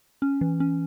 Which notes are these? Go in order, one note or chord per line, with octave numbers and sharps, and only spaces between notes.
C#4
E3
C#4